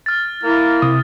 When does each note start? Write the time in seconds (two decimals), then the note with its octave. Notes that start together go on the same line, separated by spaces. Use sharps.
0.06 F6 A6
0.43 A#3 E4 A#4
0.82 C3 D#6